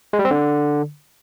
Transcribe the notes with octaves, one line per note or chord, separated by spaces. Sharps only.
G#3
G3
C4
D3